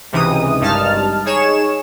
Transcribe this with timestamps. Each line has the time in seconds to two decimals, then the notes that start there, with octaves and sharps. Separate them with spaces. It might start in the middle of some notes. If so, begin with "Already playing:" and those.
0.12 C#2 C3 E3 D#4 D#6
0.60 G#1 G2 D#4 A5 F6
1.26 D#4 G#4 C#5 E7